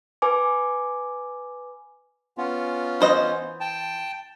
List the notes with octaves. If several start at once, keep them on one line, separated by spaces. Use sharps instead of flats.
B4 G#5 D6
B3 C#4 F4
E3 C5 D#5
G5 A5